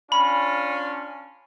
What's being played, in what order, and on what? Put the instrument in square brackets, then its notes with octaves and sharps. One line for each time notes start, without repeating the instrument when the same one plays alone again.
[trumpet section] C#4 D4 F4 [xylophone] B5